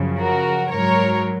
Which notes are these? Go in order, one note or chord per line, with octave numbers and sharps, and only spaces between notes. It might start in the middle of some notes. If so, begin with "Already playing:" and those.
Already playing: F#2 C#3 F3
F#4 A#4
G#2 F#3 A#4 C#5